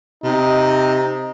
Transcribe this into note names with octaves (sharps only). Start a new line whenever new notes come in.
C3 D#4